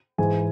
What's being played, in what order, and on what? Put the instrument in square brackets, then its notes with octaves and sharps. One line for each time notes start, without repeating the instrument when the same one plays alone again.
[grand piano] G#2 E3 G#3 G#5